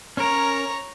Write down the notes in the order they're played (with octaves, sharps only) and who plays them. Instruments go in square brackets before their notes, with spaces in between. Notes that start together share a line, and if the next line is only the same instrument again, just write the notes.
[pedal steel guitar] C#4 A#4 [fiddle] C#5 A#5